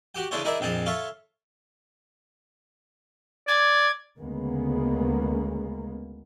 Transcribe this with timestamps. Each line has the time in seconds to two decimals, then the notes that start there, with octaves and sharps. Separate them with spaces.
0.15 F#4 G4 G5
0.31 C#3 E3 D4 A4 C5 C#5
0.44 D#4 E4 G#4 A#4 D5 E5
0.60 A#1 F2 C4 G#4 A5
0.86 F4 A4 C#5 E5 F5
3.48 D5 G#6
4.18 D2 C#3 G#3 A#3 B3